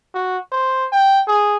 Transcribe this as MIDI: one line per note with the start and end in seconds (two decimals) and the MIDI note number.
0.14 0.37 66
0.52 0.86 72
0.92 1.21 79
1.27 1.57 68